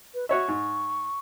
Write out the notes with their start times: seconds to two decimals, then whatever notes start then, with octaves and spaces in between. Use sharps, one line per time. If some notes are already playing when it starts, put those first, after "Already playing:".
0.14 B4
0.29 F#4 C#5 E5 C#6
0.48 G#2